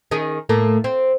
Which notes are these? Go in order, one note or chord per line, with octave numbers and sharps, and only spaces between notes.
D#3 C#4 G#4
A2 A3 A#3
C4